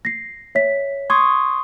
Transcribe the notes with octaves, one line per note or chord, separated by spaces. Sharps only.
A#6 C7
C#5 E5 B6
C6 C#6 D#6 G#6